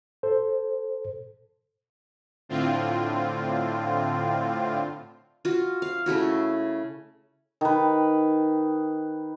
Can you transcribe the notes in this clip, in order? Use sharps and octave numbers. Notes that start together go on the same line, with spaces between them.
A4 C5
A2 D3 C4 F4
F4 F#4
F5
C#3 A3 E4 F#4
D#3 B4